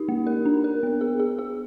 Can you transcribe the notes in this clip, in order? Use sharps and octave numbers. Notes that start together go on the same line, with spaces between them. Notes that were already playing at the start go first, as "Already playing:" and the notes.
Already playing: D#4 G4
A#3
A#4
D4
A#4
B3
G#4
G#4
G#4